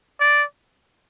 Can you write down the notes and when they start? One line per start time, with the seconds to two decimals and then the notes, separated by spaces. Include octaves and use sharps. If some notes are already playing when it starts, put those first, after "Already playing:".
0.20 D5